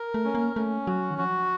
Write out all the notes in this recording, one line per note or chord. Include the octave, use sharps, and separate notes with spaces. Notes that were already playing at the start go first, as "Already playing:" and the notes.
Already playing: A#4
A3
C#4
A#3
A3 C#4
F#3 F#4
D#3
F3 F#4